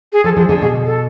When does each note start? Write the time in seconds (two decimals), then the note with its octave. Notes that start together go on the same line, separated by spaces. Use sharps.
0.13 G#4
0.24 F3 A4
0.37 F3 G#4
0.49 D3 G#4
0.62 B2 G#4
0.86 A4